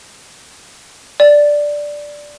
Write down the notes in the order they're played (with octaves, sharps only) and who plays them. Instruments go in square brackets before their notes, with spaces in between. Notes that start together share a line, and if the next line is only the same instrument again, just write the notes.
[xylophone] D5